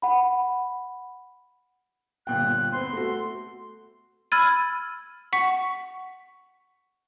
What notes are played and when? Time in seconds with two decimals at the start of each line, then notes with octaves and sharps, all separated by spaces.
0.02 F#5 B5
2.27 G1 A#2 G5 F#6
2.72 B3 C4 C6
2.93 A3 F#4
4.32 B5 E6 F6 G#6 A6 D#7
5.33 F#5 C#6 B6 C#7